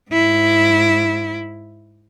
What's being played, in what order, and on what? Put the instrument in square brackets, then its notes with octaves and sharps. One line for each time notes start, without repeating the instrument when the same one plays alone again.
[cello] G#2 E4